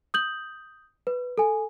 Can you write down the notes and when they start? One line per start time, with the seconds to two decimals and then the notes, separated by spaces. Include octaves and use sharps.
0.14 D#6 G6 F#7
1.07 B4
1.38 A4 G#5